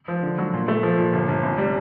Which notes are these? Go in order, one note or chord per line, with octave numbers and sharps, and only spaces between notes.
F3
D3
F#3
A#2
A3
F3
A#2
G1
G1
C2
G3